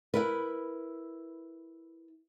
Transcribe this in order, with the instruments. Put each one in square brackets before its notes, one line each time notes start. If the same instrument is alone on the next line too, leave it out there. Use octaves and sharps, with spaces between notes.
[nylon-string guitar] E4 A#4 B4